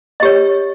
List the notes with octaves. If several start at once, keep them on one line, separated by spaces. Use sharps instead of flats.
G4 C#5 D#5